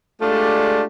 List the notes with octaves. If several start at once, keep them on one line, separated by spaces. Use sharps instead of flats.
G#3 A3 D4 F4 G4 D5